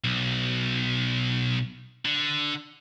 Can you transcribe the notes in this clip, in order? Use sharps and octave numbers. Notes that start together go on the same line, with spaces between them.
B1
D3